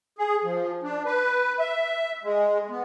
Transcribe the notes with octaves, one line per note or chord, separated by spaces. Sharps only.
G#4
F3
D4
B4
E5
G#3
B3